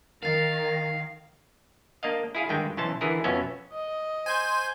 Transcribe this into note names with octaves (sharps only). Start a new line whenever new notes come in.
D#3 A#4 F5 A6
A#3 D4 D#5 F5
E4 G#4 F5
G2 D3 D#3 G#3 G5
B1 E3 C#4 C5 A5
D3 E3 E4 G#4 A#4
F2 B2 B3 C#4 E5
D#5
C5 G#5 G6 G#6